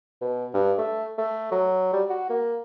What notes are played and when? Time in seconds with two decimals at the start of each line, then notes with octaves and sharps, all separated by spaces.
0.21 B2
0.54 G2
0.78 A3
1.18 A3
1.52 F#3
1.93 G3
2.09 F#4
2.30 A#3